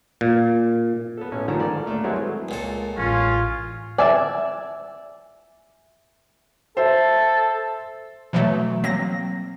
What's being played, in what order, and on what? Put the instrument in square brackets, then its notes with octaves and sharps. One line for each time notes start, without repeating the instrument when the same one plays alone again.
[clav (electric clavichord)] A#2
[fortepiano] B3 A4
A1 C#4
G#2 D#3 F3 A3 D4 A#5
A4 A#4 D5
A3 A#3 D4
F#3 G#3 C4 E4 A4 B4
[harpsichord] C#2 A#2 A4
[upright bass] A1 [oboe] C#4 [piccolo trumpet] F4
[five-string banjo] D5 [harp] E5 G#5
[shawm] A4 [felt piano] C5 E5
[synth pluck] B2 E3 F#3 A3
F#3 A#3 C4 A#6